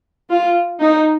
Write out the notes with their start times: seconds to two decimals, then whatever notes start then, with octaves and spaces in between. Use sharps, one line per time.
0.30 F4
0.80 D#4